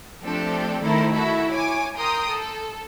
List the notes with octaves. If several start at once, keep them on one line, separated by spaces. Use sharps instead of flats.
F3 A3 C4 D4 G4 A4
D#3 A3 E4 A4 A#4 C5
E4 F#4 A4 E5
C#5 G#5 D6
A#4 G5 A#5 C6 D#6
A4